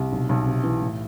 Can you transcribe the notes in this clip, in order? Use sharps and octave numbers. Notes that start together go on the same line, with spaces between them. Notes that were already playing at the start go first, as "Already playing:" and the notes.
Already playing: C2
B1
B1
C3
E3
A2